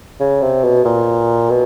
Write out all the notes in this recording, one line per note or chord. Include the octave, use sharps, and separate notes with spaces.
C#3
C3
B2
A#2
B2